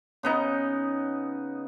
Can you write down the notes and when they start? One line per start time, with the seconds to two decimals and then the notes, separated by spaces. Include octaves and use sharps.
0.23 C#3 B3 D#4